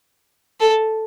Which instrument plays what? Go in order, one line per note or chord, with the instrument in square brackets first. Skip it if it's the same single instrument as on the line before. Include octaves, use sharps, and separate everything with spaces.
[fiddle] A4